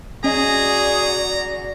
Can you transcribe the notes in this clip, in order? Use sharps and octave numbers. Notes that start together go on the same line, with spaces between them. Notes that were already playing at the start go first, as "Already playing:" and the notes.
C#4 F#4 G#4 D5 D#5 A#5